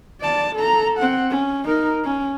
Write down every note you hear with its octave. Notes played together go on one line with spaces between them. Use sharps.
D5 A5
A4 A#5
C4 F#5
C#4
D#4 A#4
C#4